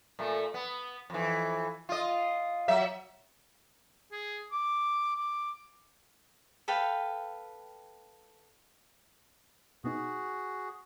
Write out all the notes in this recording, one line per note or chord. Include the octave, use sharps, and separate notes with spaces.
A#2 A3
B3
F2 E3
F4 D#5
F#3 E5
G#4
D6
D6
A4 B4 F5 G5
B2 B3 D#4 F#4 G#4